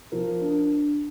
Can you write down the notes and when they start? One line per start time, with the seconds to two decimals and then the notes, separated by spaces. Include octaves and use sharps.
0.12 F3 A#4
0.42 D4